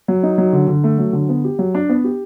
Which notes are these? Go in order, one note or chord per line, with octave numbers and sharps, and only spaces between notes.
F#3
D#4
F#3
D3
D3
A3
F#3
D3
B3
G4
F#3
D4
B3
G4